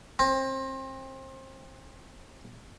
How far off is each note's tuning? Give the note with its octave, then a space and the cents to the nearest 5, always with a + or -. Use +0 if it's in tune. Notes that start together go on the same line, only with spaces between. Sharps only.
C4 +30